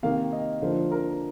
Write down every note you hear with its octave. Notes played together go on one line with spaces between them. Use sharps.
C3 D#3 A#3 F5
D#5
D3 F3 A#3 C5
A#4